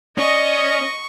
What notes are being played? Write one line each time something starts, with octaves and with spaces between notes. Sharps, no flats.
C#4 D5 D#5 C#6